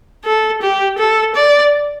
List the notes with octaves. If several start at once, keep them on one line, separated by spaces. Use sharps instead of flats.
A4
G4
A4
D5